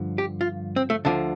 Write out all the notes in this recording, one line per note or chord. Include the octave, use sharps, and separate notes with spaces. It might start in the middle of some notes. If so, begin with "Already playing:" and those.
Already playing: G2 D3 F3
G4
F4
C4
A3
D2 D3 F3 D4